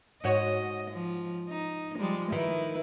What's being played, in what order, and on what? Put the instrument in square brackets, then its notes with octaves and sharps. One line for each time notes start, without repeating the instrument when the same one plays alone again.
[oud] G#2 F#4 C#5 [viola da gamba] D#5
[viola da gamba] F3
D#4
F3 G3 G#3
[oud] D#3 [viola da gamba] E4 B4